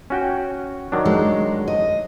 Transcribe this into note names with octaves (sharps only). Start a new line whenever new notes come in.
C#4 F#4 G5
D#3 F#3 D4
G#3
D#5